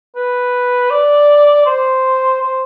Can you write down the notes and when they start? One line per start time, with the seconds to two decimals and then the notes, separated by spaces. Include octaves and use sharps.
0.15 B4
0.90 D5
1.66 C5
2.41 C5